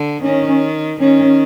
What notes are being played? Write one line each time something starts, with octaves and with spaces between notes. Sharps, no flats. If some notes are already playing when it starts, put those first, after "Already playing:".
Already playing: D3
D#3 C#4
D#3 C#4